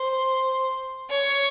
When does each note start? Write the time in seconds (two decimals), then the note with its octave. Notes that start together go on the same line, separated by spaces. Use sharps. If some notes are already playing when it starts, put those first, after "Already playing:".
Already playing: C5
1.11 C#5